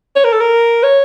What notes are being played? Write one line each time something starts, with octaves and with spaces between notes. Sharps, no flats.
C#5
A#4
A4
A#4
C#5